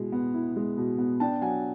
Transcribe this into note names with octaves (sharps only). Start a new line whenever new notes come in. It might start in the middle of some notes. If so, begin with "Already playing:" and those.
Already playing: B2 G#3 E4
B3
E4
G#3
B2
B3
D4 G5 A5
F#3 F#5 G#5